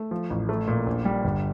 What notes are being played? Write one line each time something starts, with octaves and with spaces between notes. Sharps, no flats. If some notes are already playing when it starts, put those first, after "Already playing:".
Already playing: A3
F3
A1
A3
A#2
A#1
G3
G1